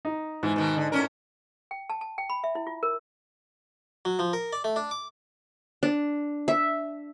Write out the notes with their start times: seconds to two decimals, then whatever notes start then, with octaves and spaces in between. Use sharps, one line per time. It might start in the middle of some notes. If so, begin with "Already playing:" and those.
0.05 D#4
0.43 G#2 E3
0.56 B2 D#3
0.77 D3
0.92 A2 C#4 A#4
1.71 G5
1.90 A5
2.01 A5
2.18 G5
2.30 B5
2.44 E5
2.55 E4
2.67 F4
2.83 A#4
4.05 F#3
4.19 F3
4.33 A#4
4.53 D5
4.64 A3
4.76 D4
4.91 D6
5.83 D4
6.48 E5